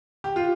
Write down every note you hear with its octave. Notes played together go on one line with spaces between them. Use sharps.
G4
F4